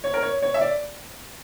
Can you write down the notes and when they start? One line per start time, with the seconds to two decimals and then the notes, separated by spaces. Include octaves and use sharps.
0.04 C#5
0.14 A#4
0.23 C#5
0.42 C#5
0.54 E5
0.61 D5